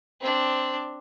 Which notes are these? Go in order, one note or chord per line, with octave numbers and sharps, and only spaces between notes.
C4 D4